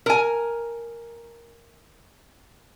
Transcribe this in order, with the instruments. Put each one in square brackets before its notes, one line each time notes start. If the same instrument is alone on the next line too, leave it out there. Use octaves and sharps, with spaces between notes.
[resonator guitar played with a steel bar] A#4 G#5